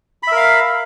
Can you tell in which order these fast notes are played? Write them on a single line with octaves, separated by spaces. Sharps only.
B5 E5 A#4 F5